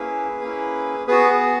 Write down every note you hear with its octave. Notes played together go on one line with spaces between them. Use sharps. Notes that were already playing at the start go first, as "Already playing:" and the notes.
Already playing: A#3 C#4 E4 G#4 B4
A#3 C#4 E4
B3 F#4 G#4 B4
G#4